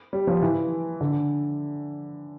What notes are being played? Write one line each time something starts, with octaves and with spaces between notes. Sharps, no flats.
G3
F3
E3
D3